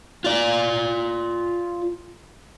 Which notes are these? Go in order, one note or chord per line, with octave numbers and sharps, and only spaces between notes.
F4 D5